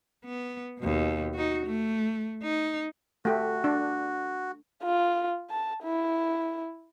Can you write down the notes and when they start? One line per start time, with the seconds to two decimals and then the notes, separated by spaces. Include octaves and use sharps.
0.25 B3
0.79 D#2 B2
1.34 D#4 F#4
1.66 A3
2.43 D#4
3.25 A3 F#4 G4
3.64 D4
4.83 F4
5.50 A5
5.83 E4